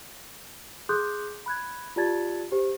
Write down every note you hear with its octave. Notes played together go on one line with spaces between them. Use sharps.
G#4 C6 D6 D#6 F#6 G6
B5 F#6 G#6
F4 G4 D5 A5 G#6 A6
G4 C5